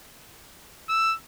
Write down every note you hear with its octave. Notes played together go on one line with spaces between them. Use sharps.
E6